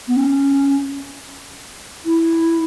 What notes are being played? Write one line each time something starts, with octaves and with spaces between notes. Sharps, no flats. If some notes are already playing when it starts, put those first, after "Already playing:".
B3
C#4
E4